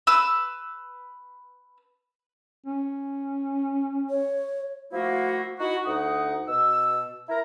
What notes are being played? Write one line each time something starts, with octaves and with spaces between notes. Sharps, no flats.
B4 E6
C#4
C#5
F3 A3 A#3 E4 F#4
D#4 E4 F#4
D2 D#4 F#5 D#6
B2 E6
E4 A#4 A#5